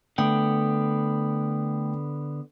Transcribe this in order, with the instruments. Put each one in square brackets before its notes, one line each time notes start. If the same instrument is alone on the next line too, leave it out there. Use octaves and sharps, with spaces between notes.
[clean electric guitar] D3 B3 [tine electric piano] A3 G5